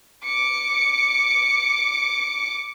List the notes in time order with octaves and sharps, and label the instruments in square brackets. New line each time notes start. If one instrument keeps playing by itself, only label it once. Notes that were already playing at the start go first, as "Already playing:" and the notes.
[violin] D6 C#7